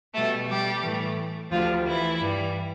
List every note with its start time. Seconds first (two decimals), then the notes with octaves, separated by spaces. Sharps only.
0.14 B2 G3 A3 A4
0.48 G3 G4
0.83 A2 E3 A3
1.50 D2 D3 F3 G3 F4
1.85 E3 E4
2.20 G2 E3 G3